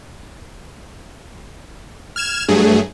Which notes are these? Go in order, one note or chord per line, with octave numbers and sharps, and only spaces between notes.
F6 G#6 E7
G2 F#3 A3 G#4